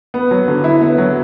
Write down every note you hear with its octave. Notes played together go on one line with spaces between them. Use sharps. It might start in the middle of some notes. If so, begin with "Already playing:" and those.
B3
F#3
D3
E4
B3
F#3